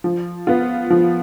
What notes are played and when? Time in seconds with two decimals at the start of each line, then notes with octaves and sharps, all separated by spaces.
0.04 F3
0.47 B3 F4
0.90 F3